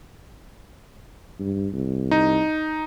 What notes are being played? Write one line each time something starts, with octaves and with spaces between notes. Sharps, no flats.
G2
C2
D#4